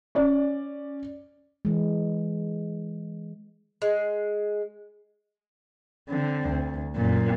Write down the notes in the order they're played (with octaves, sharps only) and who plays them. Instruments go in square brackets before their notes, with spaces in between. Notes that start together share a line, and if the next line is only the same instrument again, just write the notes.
[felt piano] C#4 D5
[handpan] E3 G#3
[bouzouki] G#3
[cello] D3 C4
D2
F#2 A#2